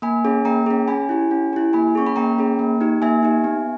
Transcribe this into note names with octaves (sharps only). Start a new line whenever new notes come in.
A#3 G#5 B5
C#4 G#4
A#3 G5 A#5
C#4 G#4
C#4 G#5 B5
E4 G4
C#4
E4 G4
A#3 G#5 B5
C#4 G#4 C#6
B5
A#3 G5 A#5
C#4 G#4
A#3
D#4 G4
A#3 E5 G#5
D#4 G4
B3